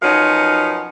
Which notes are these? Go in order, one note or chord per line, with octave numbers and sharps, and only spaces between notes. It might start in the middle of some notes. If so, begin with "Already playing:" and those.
F#2 B2 F3 C#4 D#4 F5